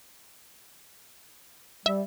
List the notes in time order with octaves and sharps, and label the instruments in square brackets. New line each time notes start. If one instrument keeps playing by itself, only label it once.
[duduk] G3 [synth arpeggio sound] E5